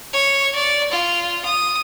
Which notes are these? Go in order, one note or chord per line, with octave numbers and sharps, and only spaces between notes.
C#5
D5
F4
D#6